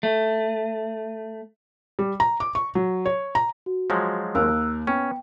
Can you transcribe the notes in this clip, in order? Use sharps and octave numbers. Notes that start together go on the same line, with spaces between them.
A3
G3
A#5
D6
C#6
F#3
C#5
A#5
F#4
F3 F#3 G#3
D#2 A#4 F5 E6 F#6
B3 C#4 G5